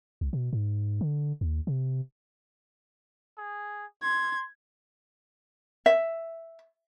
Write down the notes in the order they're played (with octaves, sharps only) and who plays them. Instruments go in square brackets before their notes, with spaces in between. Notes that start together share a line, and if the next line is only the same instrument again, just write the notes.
[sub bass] C2
B2
G#2
D3
D#2
C3
[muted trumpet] G#4
[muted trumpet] C6 [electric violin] G#6
[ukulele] E5